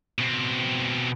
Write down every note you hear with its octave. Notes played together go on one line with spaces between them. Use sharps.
B2 C4